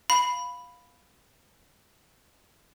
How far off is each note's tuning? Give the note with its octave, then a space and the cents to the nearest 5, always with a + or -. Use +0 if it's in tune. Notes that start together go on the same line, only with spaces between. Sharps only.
F5 +15 B5 +0